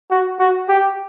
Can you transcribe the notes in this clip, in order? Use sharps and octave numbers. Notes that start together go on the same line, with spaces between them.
F#4
F#4
G4